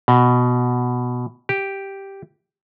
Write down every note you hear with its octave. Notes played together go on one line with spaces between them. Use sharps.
B2
G4